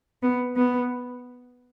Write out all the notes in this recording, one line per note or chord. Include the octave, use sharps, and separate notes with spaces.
B3
B3